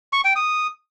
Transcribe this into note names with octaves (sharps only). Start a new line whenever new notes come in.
C#6
G5
D#6